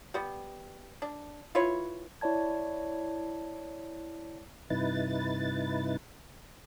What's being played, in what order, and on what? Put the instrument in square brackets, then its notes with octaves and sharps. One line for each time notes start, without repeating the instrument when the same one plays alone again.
[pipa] G3 B3
D4
E4 F4 B4 C#5
[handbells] E4 C#5 D5 A5 G#6
[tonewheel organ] G2 C3 D#4 E4 B4 A6